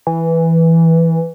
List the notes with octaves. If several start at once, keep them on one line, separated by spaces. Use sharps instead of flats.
E3